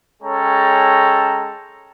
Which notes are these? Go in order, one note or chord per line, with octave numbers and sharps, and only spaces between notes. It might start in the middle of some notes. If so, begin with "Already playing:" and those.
G#3 C#4 A4 C#5 G5 A#5